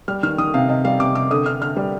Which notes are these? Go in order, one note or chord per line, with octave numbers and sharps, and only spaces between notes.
G3 F6
D#3 F6
D#3 D#6
C3 F5
C3 D#5
G3 F5
C3 D6
C3 D6
D3 D#6
D3 F6
D3 F6
G3